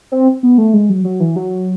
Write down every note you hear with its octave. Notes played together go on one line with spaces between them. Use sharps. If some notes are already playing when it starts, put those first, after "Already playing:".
C4
B3
A3
G#3
F#3
F#3
E3
F#3